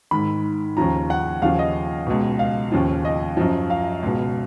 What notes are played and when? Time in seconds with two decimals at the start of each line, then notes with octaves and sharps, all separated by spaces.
0.11 G#2 D#3 B5
0.77 D#2 C#3 F3 A#5
1.10 F#5
1.42 D#2 C#3 F3 F5
1.59 D#5
2.07 C#2 B2
2.39 F5
2.72 D#2 C#3 F3
3.05 D#5
3.37 F#2 F3
3.70 F5
4.02 C#2 B2